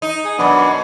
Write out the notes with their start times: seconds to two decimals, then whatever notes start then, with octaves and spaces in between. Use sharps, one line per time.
0.02 D#4
0.25 G#4
0.38 F#2 B2 F#3 B3 D4